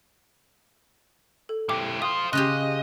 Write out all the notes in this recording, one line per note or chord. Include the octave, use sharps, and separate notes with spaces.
A4
E4 G4 D6
F4 C5 D#6
C#3 F4 G4 D#5 F#6